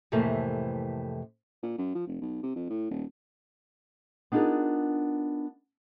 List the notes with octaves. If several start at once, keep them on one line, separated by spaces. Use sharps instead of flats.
F2 A2 C3 E3 A3 A#3
A#2
F#2
F3
F1
B1
C3
F2
A2
D#1
B3 D4 D#4 F4 G#4 A#4